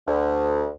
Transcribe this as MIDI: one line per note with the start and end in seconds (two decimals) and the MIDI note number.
0.07 0.68 38